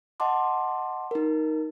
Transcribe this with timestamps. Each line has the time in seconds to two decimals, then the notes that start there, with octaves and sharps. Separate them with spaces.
0.20 D#5 F#5 A5 C6 D6
1.11 D#4 A#4